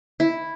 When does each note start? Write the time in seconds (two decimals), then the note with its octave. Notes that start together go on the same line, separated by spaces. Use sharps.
0.20 E4